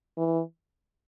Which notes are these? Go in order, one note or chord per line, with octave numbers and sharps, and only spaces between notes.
E3